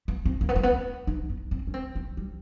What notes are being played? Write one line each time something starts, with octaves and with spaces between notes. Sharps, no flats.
B3
C4
A#3
B3
A#3
B3
D#4
B3
C4
C#4
C4
B3
G3